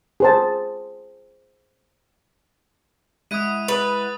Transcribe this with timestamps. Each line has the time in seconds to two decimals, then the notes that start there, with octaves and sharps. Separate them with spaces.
0.20 G#4 C5 A5
3.31 G#3 E4 F#5 D#6 D#7
3.68 B4 D#6 A6